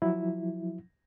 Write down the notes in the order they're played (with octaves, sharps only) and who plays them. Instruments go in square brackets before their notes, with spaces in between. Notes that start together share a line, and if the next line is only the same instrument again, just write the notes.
[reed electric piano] F3 F#3 E4